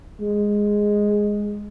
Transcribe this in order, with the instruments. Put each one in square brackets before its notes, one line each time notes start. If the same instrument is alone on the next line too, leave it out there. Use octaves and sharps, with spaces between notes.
[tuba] G#3